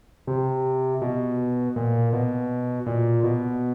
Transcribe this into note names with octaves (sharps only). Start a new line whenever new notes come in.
C3
B2
A#2
B2
A#2
B2